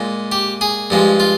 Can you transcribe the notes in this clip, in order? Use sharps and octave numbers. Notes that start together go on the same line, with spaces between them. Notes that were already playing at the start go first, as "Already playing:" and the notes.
Already playing: A#2 G#3
G4
G#4
G2 F3 G#3
F4